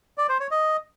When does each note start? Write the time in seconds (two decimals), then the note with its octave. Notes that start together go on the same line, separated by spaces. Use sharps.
0.18 D5
0.29 C5
0.40 C#5
0.51 D#5